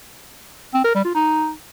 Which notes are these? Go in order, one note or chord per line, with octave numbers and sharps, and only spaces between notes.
C4
A#4
G3
F4
D#4